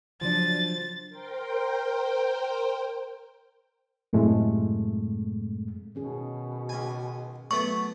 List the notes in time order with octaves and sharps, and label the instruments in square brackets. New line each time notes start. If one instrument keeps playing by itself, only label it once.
[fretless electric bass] C#3 F#3 [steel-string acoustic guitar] F3 D4 [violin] A6
[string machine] A#4 C5 G5
[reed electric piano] F#2 A2 C3 G#3 A3
[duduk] B2 [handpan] D#3 C#4 G#4
[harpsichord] C#2 G#5
[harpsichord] F#3 A3 B3 [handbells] C#6